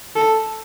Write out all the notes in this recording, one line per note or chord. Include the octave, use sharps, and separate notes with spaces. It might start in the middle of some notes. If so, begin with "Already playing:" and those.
A4